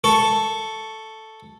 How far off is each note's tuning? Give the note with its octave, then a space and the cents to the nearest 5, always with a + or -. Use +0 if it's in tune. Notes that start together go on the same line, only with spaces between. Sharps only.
A4 +0 C#6 +0